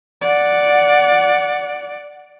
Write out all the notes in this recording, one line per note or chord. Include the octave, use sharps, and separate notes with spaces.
D5 F#5